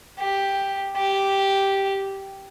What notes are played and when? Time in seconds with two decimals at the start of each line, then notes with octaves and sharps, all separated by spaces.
0.19 G4
0.96 G4